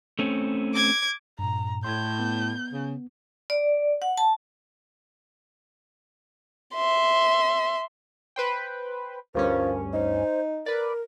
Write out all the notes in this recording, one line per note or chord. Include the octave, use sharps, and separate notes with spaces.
A3 C4 C#4
D6 G#6
G2 A#2 A#5
A2 C6 G6 G#6
B3
C#3
D5
F#5
A5
E5 C6
B4 C5 G5
D2 G2 F3 C#4 A#4
D#4 C5
A#4 B4 D5